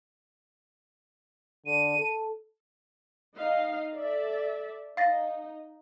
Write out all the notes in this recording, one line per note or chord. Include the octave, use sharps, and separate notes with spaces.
D3 D#7
A4
D#4 D#5 F5
A4 D5 E5
D#4 F5 A6 A#6